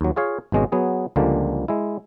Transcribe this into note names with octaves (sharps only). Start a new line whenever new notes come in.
D#2 F#3
F4 G#4 C#5 F5
G#1 B2 G#3 C#4 D#5
F#3 B3 G#4
C#2 D3 F3 G3 G#3 A#3
G#3 E4